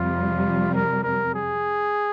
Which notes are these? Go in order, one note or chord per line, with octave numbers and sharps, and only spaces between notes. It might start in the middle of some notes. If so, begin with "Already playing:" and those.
Already playing: F2 C3 G3 F4
A#4
A#4
G#4